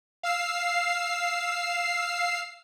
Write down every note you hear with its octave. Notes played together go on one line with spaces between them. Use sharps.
F5 E6 C7